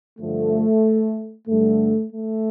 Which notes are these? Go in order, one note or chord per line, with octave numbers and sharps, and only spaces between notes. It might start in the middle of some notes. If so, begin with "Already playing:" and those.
G2 D3 F3 A3
G2 D3 G3 A3
A3